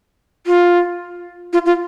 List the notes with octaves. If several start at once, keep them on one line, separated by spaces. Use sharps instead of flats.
F4
F4
F4